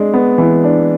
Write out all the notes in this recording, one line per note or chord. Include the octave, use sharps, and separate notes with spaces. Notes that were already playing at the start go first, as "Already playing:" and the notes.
Already playing: G#3 D4
B3
E3
D4